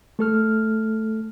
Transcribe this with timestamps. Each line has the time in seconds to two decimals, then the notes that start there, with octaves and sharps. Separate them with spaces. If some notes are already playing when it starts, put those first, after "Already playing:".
0.19 A3 A4 F6